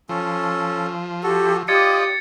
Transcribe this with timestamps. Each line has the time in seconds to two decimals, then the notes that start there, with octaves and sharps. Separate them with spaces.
0.09 F3 C#4 A4
1.23 F#4 G4 A4
1.68 F4 G4 D5 D#5 D#6 G#6 A6 C#7